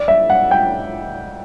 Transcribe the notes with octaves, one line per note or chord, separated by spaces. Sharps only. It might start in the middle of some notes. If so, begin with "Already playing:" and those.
Already playing: D5
E5
F#5
G5